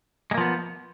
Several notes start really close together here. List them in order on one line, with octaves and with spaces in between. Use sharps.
G#3 A#3 F3 B3